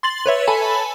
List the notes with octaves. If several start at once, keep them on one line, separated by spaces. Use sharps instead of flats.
C6 A6 F#7
B4 C#5 E5
A4 G#5 A5 B5